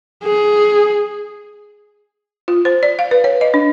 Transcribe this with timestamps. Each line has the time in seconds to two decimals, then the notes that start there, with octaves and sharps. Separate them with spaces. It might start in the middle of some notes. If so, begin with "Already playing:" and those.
0.24 G#4
2.48 F4
2.65 C5
2.83 D5
2.99 F5
3.11 B4
3.24 C#5
3.41 D#5
3.54 D4